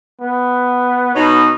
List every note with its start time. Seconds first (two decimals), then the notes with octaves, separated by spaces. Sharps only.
0.21 B3
1.15 B2 D#4 C#5